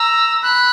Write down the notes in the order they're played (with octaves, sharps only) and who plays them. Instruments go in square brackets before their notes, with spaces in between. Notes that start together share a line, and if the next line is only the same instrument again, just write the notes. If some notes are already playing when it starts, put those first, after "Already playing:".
Already playing: [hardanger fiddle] A#5 [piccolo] E6
[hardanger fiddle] B5 [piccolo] F#6